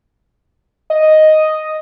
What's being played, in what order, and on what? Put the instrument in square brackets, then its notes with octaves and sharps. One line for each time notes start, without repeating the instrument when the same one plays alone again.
[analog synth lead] D#5